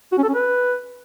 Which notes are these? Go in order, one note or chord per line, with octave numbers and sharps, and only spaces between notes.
F#4
C#4
A4
C#4
B4